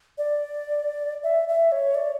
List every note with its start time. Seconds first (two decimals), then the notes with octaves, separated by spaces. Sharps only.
0.18 D5
1.23 E5
1.48 E5
1.72 C#5
1.95 D5